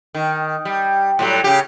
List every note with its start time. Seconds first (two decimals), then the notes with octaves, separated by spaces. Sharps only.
0.15 D#3
0.65 G3
1.19 A2 F#3 G3
1.44 C#3 G4